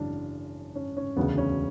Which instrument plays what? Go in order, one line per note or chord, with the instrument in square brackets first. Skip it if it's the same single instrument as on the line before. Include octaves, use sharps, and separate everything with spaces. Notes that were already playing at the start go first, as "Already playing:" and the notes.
Already playing: [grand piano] G#1 F#2 C#3 E3 D4
C#4
C#4
E1 D2 C#3 B3
C#4